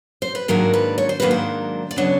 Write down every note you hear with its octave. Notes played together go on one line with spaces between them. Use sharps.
C5
B4
G#2 D#3 F#3 A#3 D4 A#4
B4
C#5
C5
G#2 D#3 F#3 A#3 D4 B4
C5
D5
C#3 F#3 B3 D4 C#5